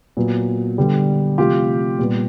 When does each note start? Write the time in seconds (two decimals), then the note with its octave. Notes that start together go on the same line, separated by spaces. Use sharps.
0.17 A#2 F#3 B3
0.77 D3 G3 B3
1.38 C3 F3 A3 F4 G4
1.99 A#2 G3 B3